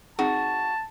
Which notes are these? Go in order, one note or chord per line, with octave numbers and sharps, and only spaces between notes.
C4 D#4 F#4 G#4 A5